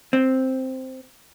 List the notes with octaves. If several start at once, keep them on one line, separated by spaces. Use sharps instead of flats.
C4